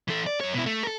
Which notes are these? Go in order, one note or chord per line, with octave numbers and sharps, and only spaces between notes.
E3 A4
D5
F#2 C#5
B2 E4
A3
A4 A#4